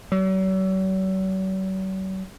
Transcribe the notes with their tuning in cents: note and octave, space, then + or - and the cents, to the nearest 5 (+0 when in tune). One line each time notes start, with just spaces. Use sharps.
F#3 +45